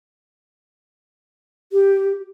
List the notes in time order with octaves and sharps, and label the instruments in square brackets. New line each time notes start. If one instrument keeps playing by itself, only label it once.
[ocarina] G4